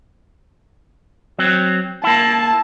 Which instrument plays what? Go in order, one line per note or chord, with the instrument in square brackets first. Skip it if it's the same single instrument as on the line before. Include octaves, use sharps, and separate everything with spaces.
[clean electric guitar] F#3 C4
[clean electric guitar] A#3 E4 [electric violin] A5